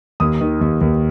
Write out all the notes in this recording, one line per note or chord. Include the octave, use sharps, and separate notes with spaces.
D#2 D#6
D#3
D#2
D#2